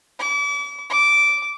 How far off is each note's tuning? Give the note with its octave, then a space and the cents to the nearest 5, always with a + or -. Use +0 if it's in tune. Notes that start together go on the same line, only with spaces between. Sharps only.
D6 -40
D6 -10